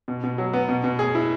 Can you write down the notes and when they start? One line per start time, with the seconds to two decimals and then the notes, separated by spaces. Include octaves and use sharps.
0.08 B2
0.24 B2
0.38 F#3
0.53 B3
0.69 B2
0.84 B2
0.99 G#4
1.15 E4